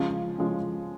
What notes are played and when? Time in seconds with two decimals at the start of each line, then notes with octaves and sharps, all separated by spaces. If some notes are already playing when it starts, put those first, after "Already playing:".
Already playing: C#3 F3 G#3 C#4
0.38 C#3 F3 G#3 C#4